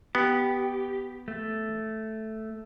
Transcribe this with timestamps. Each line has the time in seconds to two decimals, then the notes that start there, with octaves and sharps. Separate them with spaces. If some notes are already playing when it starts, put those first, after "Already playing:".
0.15 B3 G4
1.28 A3